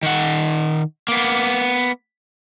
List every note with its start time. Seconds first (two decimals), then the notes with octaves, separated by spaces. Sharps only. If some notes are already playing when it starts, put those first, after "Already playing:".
0.03 D#3 F#5
1.08 A#3 B3